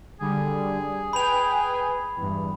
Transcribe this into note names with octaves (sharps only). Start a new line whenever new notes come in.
D3 G3 G#4
B4 G5 G#5 B5 F7
E2 G2